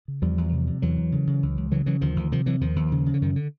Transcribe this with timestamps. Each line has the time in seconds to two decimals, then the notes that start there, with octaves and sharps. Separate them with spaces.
0.08 C#3
0.22 E2 F3 G3
0.38 E2
0.52 C3
0.67 C3
0.82 E2 E3 F#3
0.98 E2
1.12 C#3
1.27 C#3
1.43 C#2
1.57 C#2
1.71 C#3 E3 F#3
1.86 C#3 E3 F#3
2.01 D2 D#3 F3
2.16 D2
2.31 C3 D#3 F3
2.46 C3 E3 F#3
2.61 D#2 D#3 F3
2.76 D#2
2.92 C#3
3.06 C#3
3.14 D3
3.22 F#2 D#3
3.36 D3